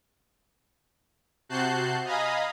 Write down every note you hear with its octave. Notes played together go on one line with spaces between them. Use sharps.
C3 F#4 A5 F#6 G6 C7
D#5 F5 G#5 A#5 B5 D#6